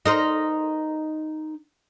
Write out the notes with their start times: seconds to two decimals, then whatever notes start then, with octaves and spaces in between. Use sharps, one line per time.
0.05 D#4 A#4 C5